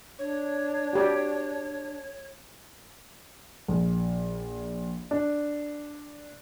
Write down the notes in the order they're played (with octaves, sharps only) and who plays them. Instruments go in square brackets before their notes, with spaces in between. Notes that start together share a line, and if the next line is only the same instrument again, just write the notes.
[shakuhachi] D4 [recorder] C#5
[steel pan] F#4 G4 D5
[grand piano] A#1
D4